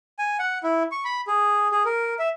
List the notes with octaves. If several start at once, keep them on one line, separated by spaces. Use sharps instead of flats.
G#5
F#5
E4
C#6
B5
G#4
G#4
A#4
E5